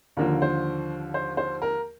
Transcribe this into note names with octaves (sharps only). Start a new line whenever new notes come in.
D#2 D3 F3 A#4
C5
C5
C5
A#4